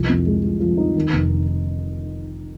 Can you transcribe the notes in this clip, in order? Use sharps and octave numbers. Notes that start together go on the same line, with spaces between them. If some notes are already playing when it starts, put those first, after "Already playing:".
Already playing: C2 F3
F2
G#3
F3
F3
D#4
D#3
F1